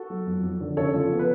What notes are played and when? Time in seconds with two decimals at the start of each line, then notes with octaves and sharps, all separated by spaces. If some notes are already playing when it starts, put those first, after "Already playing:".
Already playing: F#4 A4
0.10 F#3
0.27 F2
0.43 F2
0.61 D3
0.77 C#3 A4 C#5
0.94 F3
1.10 B3
1.19 B4